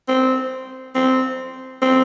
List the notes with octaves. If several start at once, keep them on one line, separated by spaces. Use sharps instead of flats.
C4
C4
C4